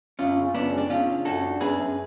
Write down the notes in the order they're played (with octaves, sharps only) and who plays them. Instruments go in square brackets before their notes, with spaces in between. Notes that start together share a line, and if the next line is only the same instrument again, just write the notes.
[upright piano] F#2 [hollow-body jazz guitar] C#4 F4
[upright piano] C#3
[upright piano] F#2 [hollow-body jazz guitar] B3 D4
[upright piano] G#3
[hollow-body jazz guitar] D4
[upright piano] C#3 [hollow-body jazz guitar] C#4 F4
[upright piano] D4
[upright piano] F#2 [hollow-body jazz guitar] F#4 A4
[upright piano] D4
[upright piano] F#2 [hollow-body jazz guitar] G#4 B4
[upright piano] F#2